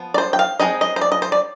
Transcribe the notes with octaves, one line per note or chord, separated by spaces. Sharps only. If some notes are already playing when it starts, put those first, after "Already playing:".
Already playing: F3 B3
D5
C5
G5
F5
G#3 C4 D#4 D#5
D#5
C5
D5
D#5
C5
D5